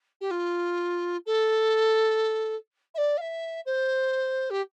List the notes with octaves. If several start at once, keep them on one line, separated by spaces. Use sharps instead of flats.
G4
F4
A4
E5
D5
F5
E5
C5
G4